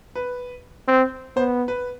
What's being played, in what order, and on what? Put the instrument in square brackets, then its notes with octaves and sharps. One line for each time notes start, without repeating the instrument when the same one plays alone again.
[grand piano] B4
[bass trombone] C4
[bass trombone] B3 [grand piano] C5
[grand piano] B4